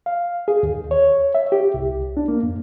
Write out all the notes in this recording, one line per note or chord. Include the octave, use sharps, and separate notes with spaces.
F5
G#4
D#2
C#5
E5
G4
C2
D4
A#3
F2